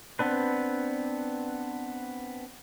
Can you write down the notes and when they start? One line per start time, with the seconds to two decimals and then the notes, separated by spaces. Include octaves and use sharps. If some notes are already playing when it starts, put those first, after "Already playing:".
0.19 B3 C4 D4 B4